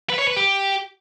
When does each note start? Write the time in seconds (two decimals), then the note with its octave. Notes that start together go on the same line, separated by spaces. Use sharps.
0.10 B4
0.19 C#5
0.27 B4
0.36 G4